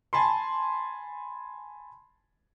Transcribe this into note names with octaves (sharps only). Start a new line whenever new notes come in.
G#5 A5 B5 C6